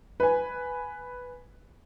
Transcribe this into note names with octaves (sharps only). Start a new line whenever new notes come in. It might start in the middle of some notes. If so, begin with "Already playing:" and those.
B4 G#5